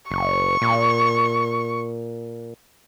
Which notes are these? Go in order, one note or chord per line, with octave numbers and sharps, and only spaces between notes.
F#1 C#6
A#2